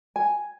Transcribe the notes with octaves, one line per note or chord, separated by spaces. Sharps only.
G#5